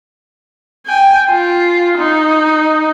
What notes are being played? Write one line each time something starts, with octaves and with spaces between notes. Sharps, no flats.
G5 G#5
F4
D#4